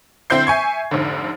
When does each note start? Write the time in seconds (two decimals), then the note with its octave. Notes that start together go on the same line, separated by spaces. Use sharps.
0.30 D3 C4 E4 C5 G6 C7
0.47 E5 G#5 C#6 G#6
0.91 F1 G#2 D3